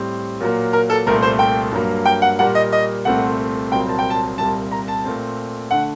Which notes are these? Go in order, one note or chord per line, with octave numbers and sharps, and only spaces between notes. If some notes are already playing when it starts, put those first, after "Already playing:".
Already playing: A2 G3 C4
A#2 F#3 A#3
A#4
A4
C2 A#2 A3 C4 A#4
C5
G5
G2 F#3 A#3
G5
F#5
A#2 G3 A#3 F#5
D#5
D#5
C2 A#2 A3 C4 F#5
C2 A#2 F#3 C4 G5
A5
G5
A5
C2 A#2 G3 C4 A5
A#5
A5
A#2 A3 C4
D3 A3 F#5